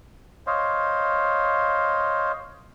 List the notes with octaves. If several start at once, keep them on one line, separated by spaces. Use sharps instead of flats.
C5 C#5 D#5 F5